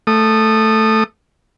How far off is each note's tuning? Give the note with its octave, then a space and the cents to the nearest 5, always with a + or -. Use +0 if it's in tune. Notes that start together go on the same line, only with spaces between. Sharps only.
A3 +0 D#6 -25